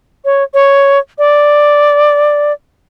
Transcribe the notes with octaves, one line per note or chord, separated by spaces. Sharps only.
C#5
C#5
D5